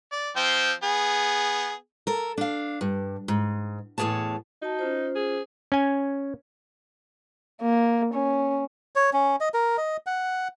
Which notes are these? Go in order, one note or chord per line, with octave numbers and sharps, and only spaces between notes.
D5
F3 C4 G5
B3 G#4
A4 A#4
D4 F5
G2
G#2
E2 A2 G#4 C#5 A5
D#4 F#4 A5
C#4 F4 C5
G#4
C#4 G#5
A#3
C#4
C#5
C#4
D#5
A#4
D#5
F#5